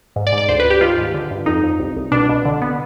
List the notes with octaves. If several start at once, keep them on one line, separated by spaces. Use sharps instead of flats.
G#2
D5
G#2
D5
D2 C5
B4
D2
G4
D#3 F4
G#2
D3
G2
F2 D#4
F2
C2
C2
B2 D4
B2
D3
B3